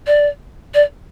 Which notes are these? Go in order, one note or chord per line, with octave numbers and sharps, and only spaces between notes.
D5
D5